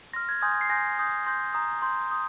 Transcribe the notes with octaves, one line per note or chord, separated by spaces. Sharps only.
C6 F6 A#6
G#6
G#5 C6 D#6 G6 G#6
A#6
C7
G#5 C6 G6 A#6
G#5 D#6 G6
C6 G6 A#6
A#5 D#6 G6
C6 G6
D#6 G6